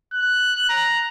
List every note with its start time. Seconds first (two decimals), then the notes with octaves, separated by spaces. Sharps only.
0.13 F#6
0.69 A#5